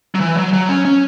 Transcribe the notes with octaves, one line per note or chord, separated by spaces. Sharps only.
F#3
E3
F#3
F#3
C#4
C#4